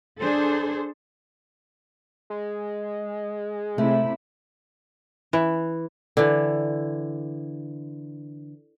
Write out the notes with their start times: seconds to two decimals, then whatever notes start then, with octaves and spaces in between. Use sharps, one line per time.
0.19 D4 G#4 A4 C5
2.30 G#3
3.78 C3 A3 E4
5.33 E3
6.17 D3 E3